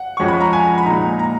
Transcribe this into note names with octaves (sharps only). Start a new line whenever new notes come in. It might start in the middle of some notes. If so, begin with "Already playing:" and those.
Already playing: F#5
F2 F3 G#3 C#4 C#6
B5
A#5
G#5
B5
A#2 G#3 D#4 A#5
A#5